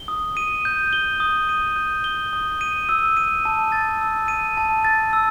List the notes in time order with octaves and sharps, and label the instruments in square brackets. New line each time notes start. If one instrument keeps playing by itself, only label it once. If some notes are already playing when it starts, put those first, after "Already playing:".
Already playing: [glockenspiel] G7
D#6
D#7
G6
G7
D#6
D#7
G6
G7
D#6
D#7
E6
D#7
A5
A6
E6
D#7
A5
A6
E6